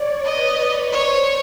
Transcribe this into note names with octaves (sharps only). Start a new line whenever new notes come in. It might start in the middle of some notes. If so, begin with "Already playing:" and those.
Already playing: C#5 D5
B4 D#5
B4
C5 C#5